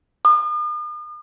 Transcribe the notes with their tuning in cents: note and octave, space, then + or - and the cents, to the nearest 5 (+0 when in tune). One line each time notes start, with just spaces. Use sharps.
D#6 -45